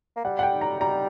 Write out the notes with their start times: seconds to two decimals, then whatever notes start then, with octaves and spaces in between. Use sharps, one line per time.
0.16 A#3
0.24 G3 F#5
0.39 F#5
0.43 G5
0.61 A#5
0.80 G3 A#5